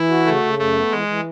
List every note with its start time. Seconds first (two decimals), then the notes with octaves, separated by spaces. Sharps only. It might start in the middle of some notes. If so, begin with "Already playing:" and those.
Already playing: E3 E4
0.09 F#4
0.25 C#3 A3
0.43 C#3
0.58 F#2 A3
0.75 B3
0.91 E3 G#3
1.07 E3